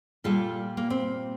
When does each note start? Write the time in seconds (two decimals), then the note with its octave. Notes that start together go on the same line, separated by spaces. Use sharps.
0.24 A#2 G3 A#3 F4 A4
0.77 A#3
0.90 C4